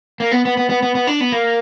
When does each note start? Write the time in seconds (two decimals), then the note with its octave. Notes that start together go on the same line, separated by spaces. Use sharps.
0.20 A#3
0.32 B3
0.45 B3
0.57 B3
0.70 B3
0.83 B3
0.95 B3
1.07 D4
1.21 B3
1.32 A#3